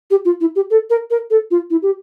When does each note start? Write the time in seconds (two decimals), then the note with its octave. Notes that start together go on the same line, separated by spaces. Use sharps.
0.10 G4
0.25 F4
0.41 E4
0.56 G4
0.70 A4
0.90 A#4
1.10 A#4
1.30 A4
1.51 F4
1.70 E4
1.82 G4